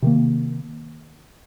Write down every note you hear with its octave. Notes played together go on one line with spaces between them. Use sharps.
C3 D#3 A#3